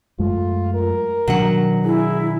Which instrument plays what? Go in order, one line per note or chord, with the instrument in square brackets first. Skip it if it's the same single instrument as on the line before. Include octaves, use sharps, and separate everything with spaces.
[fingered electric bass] F#2 G#3 A3 [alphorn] F4
[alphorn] A#4
[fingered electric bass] B2 D#3 D4 [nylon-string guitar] F#3 F#5
[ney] E4 [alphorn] G#4